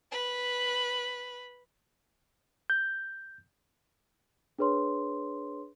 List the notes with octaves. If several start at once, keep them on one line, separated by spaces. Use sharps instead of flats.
B4 B5
G6
D4 G#4 B4 C#5 C6